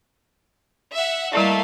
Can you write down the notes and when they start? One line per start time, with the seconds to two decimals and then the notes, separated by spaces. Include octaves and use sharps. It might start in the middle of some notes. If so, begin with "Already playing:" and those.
0.94 E5 F#5
1.33 G3 A3 A#3 E4 D5 F5